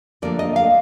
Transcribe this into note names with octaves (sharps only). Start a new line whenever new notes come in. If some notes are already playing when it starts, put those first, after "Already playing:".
D3 F3 A#3 D4 D5
D#5
F5